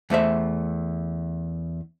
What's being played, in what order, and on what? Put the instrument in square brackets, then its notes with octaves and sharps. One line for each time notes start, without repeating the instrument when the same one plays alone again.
[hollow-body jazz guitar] E2 A3 C5 E5